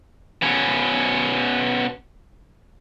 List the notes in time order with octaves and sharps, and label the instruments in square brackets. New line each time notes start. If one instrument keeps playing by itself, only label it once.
[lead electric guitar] B2 C#4